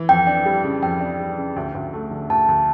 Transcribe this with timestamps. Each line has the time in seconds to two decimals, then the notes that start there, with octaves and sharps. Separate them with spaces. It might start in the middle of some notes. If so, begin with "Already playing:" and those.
Already playing: E3
0.09 F2 G5
0.27 D4
0.45 G3
0.64 C#3
0.82 F2 G5
1.01 D4
1.20 G3
1.37 C#3
1.56 D2
1.75 D2
1.93 A3
2.11 D3
2.30 D2 A5
2.48 D2